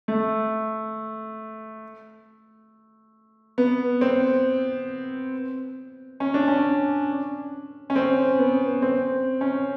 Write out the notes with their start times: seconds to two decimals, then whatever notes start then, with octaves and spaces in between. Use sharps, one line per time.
0.08 A3
3.58 B3
4.01 C4
6.20 C#4
6.34 D4
6.48 C#4
7.90 C#4
7.96 C4
8.39 B3
8.82 C4
9.41 C#4